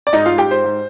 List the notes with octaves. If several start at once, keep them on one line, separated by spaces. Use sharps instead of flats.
D5
G#2 D#4 D#5
G#2 F4 F5
G4 G5
G#2 C5
G#2